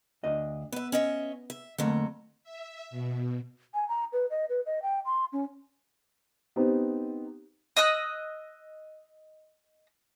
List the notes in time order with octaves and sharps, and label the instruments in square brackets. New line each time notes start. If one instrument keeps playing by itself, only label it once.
[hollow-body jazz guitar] D2 D4 D#5
[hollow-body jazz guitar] B3 [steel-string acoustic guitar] B4 E5
[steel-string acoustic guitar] C#4 D#5 E5
E5
[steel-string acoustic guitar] F2 F#3 [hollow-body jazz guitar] D3 A3 A#3
[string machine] E5
B2
[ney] G#5
A#5
B4
D#5
B4
D#5
G5
C6
C#4
[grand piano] B3 C4 D#4 G4
[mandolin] D#5 E6 F#6